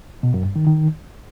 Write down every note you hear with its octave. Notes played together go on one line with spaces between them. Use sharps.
B2
F#2
G2
D#3
D#3